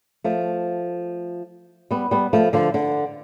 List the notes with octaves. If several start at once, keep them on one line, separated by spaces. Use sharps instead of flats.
F3 A3
G3 B3
G3 B3
F3 A3
D3 F3
D3